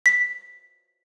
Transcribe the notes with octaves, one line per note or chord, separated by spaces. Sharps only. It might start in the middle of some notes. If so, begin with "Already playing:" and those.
B6